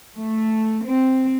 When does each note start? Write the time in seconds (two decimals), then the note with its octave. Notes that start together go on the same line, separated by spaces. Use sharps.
0.16 A3
0.85 C4